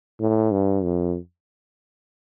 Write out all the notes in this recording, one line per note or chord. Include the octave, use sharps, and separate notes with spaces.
A2
G2
F2